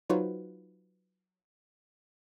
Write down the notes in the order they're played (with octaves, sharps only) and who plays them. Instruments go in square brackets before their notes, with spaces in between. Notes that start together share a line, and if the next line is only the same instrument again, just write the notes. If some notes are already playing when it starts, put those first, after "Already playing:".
[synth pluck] F#3 D#4 F4 F#4 B4 C5